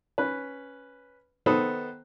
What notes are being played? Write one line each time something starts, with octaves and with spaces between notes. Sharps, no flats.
C#4 B4
D#3 B3 A4 C5 B5 D#6